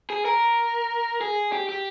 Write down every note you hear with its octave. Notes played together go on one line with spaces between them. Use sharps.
G#4
A#4
G#4
G4
G4